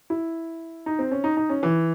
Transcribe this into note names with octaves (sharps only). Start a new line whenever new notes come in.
E4
D#4
C4
C#4
D#4
D#4
C#4
E3